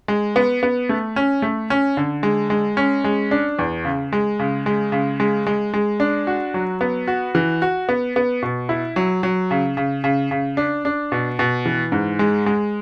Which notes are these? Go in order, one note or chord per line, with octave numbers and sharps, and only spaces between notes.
G#3
B3
B3
A3
C#4
A3
C#4
D3
G#3
G#3
C#4
G#3
D4
E2
C#3
G#3
C#3
G#3
C#3
G#3
G#3
G#3
D4
F#4
F#3
B3
F#4
E3
F#4
B3
B3
B2
E4
F#3
F#3
C#3
C#3
C#3
C#3
D4
D4
B2
B2
E3
G#2
G#3
G#3